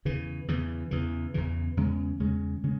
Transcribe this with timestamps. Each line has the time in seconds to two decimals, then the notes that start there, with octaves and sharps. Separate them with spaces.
0.05 E2 C#3 E3
0.48 E2 C#3 E3
0.91 E2 C#3 E3
1.34 E2 C#3 E3
1.77 E2 C#3 G#3 C#4
2.20 E2 C#3 G#3 C#4
2.63 C#3 G#3 C#4